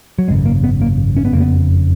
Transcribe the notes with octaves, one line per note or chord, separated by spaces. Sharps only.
F#3
G#1 F#2 C#3 G#3
A#3
B3
A#3
C#4
B3
F#1 F2 C#3 A#3
B3